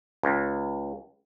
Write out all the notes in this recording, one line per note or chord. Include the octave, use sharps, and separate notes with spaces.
C#2